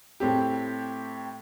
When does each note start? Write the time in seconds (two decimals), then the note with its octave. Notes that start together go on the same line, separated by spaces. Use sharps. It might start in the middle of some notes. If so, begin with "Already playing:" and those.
0.20 A2 C4 G4